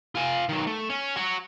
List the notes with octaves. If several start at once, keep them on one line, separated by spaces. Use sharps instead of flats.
F4 G#5
D#3 F#3
A3
C#4
F#4 C#5